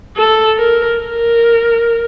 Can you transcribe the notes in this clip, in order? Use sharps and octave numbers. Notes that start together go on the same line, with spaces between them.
A4
A#4
A#4